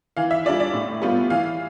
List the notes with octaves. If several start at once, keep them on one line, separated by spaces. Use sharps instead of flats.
E3 F5
E5
G3 D4 F4 D5
D5
A2
G3 B3 F4
E3 F5